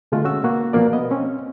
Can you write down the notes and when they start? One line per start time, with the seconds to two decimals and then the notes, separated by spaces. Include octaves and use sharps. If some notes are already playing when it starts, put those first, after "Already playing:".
0.12 B2 D3 G#3 A3 F4 F#4
0.24 C#4 F#4 E6
0.43 B2 A#3 F#4
0.73 B2 F3 A#3 A#4 D5
0.93 B3 D#5
1.11 C4 C#4